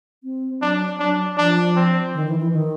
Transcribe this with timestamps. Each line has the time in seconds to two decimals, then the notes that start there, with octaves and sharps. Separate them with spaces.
0.24 C4
0.61 F#3 D4
0.99 F#3 D4
1.37 F3 D4
1.76 C4
2.14 D#3
2.27 E3
2.40 E3
2.52 D#3